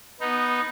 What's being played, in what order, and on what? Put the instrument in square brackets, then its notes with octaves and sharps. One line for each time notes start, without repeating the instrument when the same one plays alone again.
[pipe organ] B3 D#4